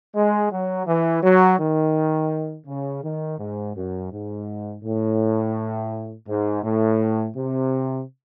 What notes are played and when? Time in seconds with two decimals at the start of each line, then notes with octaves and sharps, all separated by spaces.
0.15 G#3
0.52 F#3
0.87 E3
1.23 F#3
1.59 D#3
2.67 C#3
3.03 D#3
3.39 G#2
3.76 F#2
4.12 G#2
4.84 A2
6.28 G#2
6.63 A2
7.36 C3